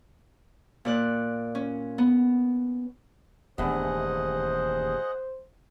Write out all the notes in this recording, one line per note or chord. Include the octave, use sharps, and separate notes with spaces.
A#2 D5 F#6
C#4
B3
D#1 E2 G2 A3 G#4 C5 D#5 F#5